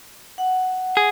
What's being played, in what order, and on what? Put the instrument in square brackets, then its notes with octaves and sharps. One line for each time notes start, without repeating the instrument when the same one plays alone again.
[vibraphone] F#5
[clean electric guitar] G#4